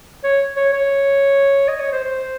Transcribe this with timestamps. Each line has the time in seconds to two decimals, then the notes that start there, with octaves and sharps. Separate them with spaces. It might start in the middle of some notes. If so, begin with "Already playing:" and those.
0.24 C#5
0.57 C#5
0.73 C#5
1.68 D#5
1.80 C#5
1.92 C5
2.05 C5